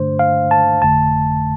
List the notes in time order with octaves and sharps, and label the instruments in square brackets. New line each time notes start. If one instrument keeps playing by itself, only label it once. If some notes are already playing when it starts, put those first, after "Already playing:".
Already playing: [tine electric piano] G2 D3 A3 D4 C5
F5
A5
G1 F2 D3 A3 A5